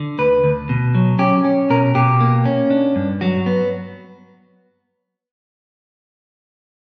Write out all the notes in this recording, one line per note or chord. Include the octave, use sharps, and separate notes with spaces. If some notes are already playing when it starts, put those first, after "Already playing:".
Already playing: D3
D2 B4
D2
B2
F#3
C#4 G4
C#4
B2 A#4
B2 G4
A#3
C#4
D4
G2
F#3 F#4
B3